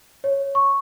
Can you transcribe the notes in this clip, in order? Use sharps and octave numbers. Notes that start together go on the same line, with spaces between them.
C#5
C#6